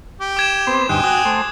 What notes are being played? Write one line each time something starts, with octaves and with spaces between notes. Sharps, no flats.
G4
D6 G#6 E7
B3 C4 C5
D2 G2 D#4 G5 G#5 F#6
F#4 D#6
A3 C5